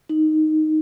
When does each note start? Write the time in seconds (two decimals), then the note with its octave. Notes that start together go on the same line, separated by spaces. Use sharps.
0.09 D#4